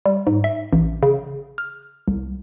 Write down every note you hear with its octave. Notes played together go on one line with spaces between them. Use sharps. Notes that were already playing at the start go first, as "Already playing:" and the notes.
G3
G#2
E5
A1
C#3
F6
C2